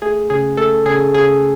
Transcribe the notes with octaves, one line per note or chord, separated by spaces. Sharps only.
A3 G#4
C#3 G#4
A3 A4
C#3 G#4
C#3 G#4